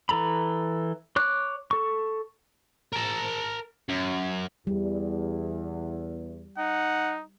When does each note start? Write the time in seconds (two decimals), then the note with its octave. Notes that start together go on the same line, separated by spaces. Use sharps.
0.09 E3 A4 A#5 B5
1.16 C#5 D6 F#6
1.71 A4 C#6
2.93 A#4 A5
3.89 F#2
4.67 E2 G3
6.58 D#4 F#5